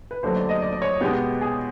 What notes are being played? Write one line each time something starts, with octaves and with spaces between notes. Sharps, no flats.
B4
D#2 D3 F#3 A3 C5
D5
D#5
D5
D5
C#5
B2 G#3 B3 G4
G#4